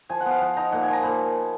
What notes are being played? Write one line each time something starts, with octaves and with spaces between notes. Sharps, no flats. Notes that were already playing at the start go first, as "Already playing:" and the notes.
F3 G#5
F#5
B3 F5
F3 F#5
D#4 A#5
A#2 F#5
F3 G#5
A#5
A#2 B5